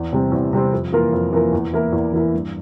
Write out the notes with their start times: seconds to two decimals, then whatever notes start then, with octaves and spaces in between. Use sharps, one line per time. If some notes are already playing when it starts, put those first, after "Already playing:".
Already playing: E2
0.13 C3 G3 C4
0.32 E2
0.53 C3 G3 C4
0.72 F2
0.92 E3 A#3 F4 A#4
1.13 F2
1.33 E3 A#3 F4 A#4
1.53 E2
1.73 E3 A#3 E4 A#4
1.93 E2
2.13 E3 A#3 E4 A#4
2.34 G2